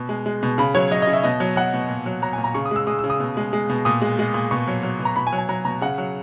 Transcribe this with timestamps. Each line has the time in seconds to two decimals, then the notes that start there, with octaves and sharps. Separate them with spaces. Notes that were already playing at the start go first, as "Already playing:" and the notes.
Already playing: B2
0.09 G#3
0.26 G#3
0.43 B2
0.58 C#3 B5
0.75 F#3 C#5
0.91 F#3 D#5
1.02 D#5
1.07 C#3
1.13 E5
1.23 B2 D#5
1.40 F#3
1.56 F#3 F#5
1.74 B2
1.89 A#2
2.06 F#3
2.22 F#3 A#5
2.33 G#5
2.38 A#2
2.44 A#5
2.54 C#3 C#6
2.65 D#6
2.71 G#3 E6
2.87 G#3 D#6
2.99 E6
3.04 C#3
3.10 D#6
3.20 B2
3.37 G#3
3.53 G#3
3.70 B2
3.85 A#2 D#6
4.02 G#3
4.19 G#3
4.34 A#2
4.51 B2 C#6
4.67 F#3
4.83 F#3
4.99 B2
5.05 A#5
5.16 B2 B5
5.27 G#5
5.33 F#3
5.38 G#5
5.49 F#3 A#5
5.65 B2 A#5
5.81 C#3 F#5
5.98 F#3